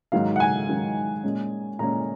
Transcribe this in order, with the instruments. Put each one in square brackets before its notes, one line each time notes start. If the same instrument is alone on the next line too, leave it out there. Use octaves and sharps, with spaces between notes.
[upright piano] G#2 D#3 F#3 F5
F#5
G#5
G#2 D#3 F#3
A#2 G#3 C#4
A#2 G#3 C#4 A#5